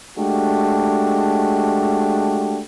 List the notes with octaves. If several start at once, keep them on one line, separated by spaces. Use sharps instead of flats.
G#3 A3 D4 F#4 G4